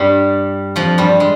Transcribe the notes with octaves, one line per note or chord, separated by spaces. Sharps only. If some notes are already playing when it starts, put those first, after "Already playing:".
Already playing: G2 G3
F2 F3
G2 G3
G#3